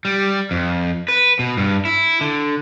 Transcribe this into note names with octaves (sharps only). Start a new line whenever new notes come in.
G3
F2
B4
B2
G2
E4
D3